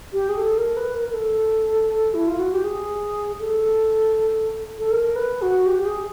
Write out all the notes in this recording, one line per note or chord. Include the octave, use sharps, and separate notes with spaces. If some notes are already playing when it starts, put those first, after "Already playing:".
G4
G#4
A4
A#4
B4
A#4
A#4
A4
E4
F4
F#4
G4
G#4
A4
A4
A#4
B4
F#4
G4
G4
G#4